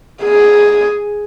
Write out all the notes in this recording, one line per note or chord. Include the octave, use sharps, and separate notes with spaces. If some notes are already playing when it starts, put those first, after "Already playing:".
G#4